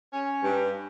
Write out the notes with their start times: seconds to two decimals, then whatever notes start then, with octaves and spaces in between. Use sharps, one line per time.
0.13 C#4
0.42 G2